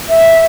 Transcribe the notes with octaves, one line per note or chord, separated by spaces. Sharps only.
E5